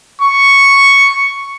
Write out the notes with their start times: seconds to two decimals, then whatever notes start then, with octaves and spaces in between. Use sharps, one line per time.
0.21 C#6